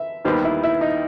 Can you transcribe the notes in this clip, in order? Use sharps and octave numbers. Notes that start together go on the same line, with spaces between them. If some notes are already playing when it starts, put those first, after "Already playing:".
Already playing: E5
D#2 D#3 G3 B3 C5
E4
E4
D#4